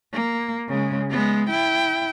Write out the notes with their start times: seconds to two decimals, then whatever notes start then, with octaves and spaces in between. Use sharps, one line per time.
0.13 A#3
0.69 C#3 G#3
1.11 G#3 B3
1.50 E4 G5